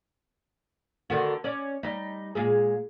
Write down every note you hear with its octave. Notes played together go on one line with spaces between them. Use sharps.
D3 D#3 F#4
C#4 D5
G3 D#4
A#2 G#3 G#4